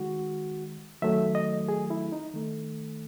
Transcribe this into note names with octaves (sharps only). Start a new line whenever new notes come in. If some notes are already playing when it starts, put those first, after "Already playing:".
Already playing: D#3 G#3 F#4
D#3 F#3 A3 E5
D#5
G#4
E4
D#4
D#3 A3